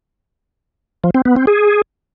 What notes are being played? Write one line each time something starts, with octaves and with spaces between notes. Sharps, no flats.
F3
C4
B3
C4
G#4